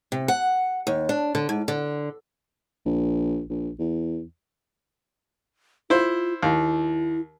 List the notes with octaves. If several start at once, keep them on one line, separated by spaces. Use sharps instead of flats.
C3
F#5
D#2
D4
D3
G#2
D3
A#1
A#1
E2
E4 F4 C5
D#2 E4